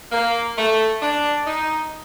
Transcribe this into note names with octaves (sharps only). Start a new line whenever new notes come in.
A#3
A3
D4
D#4